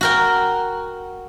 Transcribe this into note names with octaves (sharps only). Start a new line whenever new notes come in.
F#4 A#4 G5